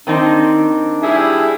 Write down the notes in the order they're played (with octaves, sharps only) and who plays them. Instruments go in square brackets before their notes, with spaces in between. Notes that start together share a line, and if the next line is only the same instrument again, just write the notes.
[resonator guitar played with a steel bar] D#3 C4 D#4 [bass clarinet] D4
[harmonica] G3 E4 G#4